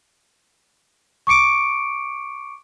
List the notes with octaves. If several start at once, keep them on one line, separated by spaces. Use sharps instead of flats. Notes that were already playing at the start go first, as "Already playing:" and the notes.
C#6 D6 C#7 D7